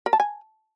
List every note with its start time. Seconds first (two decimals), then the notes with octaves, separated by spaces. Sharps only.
0.06 A#4
0.13 A5
0.20 G#5